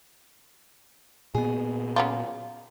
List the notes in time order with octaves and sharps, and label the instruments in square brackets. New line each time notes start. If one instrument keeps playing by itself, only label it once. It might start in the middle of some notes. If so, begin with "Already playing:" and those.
[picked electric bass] A#2 B3 [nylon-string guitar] G#4
[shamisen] C#3 F#3 F4